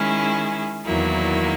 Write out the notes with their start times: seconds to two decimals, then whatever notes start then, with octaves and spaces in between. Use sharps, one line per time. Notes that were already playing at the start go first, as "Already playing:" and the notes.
Already playing: D#3 G#3 C#4 E4 G#4
0.85 E2 D#3 F#3 A#3 E4